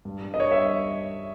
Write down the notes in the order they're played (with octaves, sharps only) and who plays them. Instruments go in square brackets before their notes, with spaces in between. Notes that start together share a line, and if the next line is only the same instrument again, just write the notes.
[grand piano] G2
G2
D#5
G2 C#5
E5